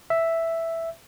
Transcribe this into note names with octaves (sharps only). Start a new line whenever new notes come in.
E5